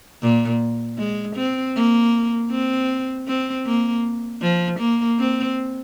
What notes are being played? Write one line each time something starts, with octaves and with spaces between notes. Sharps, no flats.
A#2
G#3
C4
A#3
C4
C4
A#3
F3
A#3
C4